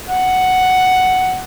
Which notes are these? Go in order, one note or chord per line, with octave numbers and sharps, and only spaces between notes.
F#5